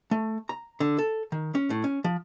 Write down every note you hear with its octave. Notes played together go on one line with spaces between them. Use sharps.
A3
A#5
D3
A4
D#3
C#4
A2
C#4
F3